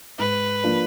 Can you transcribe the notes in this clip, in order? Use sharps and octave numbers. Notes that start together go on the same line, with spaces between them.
G#2 B4
F3 A#3 D4